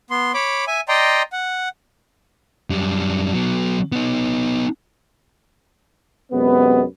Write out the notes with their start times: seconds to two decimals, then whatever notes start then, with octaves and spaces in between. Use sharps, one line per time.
0.11 B3 C6
0.34 C#5 B5 D6
0.67 E5 G#5
0.88 D5 D#5 G5 A#5 C6
1.33 F#5
2.70 F#2 G3
3.33 F#3 B3
3.92 B3 D#4
6.31 F#2 C3 G#3 B3